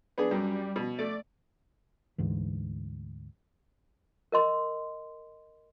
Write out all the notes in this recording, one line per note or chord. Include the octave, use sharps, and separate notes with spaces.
B3 D4 G#4
F#2 G3
B2
A3 D5
D2 G#2 E3
A#4 D#5 C6